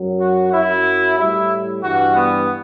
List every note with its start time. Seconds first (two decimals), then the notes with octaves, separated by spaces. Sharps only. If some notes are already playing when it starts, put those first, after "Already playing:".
Already playing: F#2 F#3
0.20 F#4
0.52 F#2 F#3 E4
1.18 A2 G3 E4
1.83 G2 E3 G3 F#4
2.16 B3